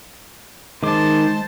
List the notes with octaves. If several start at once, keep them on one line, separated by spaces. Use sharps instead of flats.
D#3 G#3 C5 A5 D6